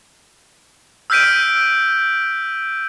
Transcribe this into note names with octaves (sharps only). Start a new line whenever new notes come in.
E6 F6 G6 B6 D7 D#7